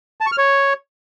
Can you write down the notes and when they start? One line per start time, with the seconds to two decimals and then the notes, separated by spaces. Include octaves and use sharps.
0.21 A5
0.26 C#6
0.32 F6
0.38 C#5